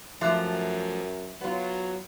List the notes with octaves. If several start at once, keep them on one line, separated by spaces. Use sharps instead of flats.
F#2 F3 A3 E5 D6 F#6
F#3 B3 F4